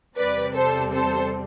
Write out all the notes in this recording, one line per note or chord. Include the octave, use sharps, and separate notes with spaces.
E2 C3 G3 C4 B4 D5
A4 C5
A4 C5